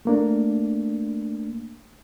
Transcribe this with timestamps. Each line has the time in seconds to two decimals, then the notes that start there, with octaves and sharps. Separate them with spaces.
0.05 A3 A#3 D4